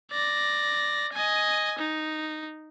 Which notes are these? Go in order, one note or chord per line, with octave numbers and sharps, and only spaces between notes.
D5 A#6
D#5 G#5
D#4